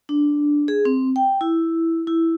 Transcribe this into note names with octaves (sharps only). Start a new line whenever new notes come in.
D4
G#4
C4
G5
E4
E4